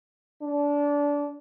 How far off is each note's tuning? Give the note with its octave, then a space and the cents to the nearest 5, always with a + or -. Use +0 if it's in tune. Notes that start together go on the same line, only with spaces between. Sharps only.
D4 -25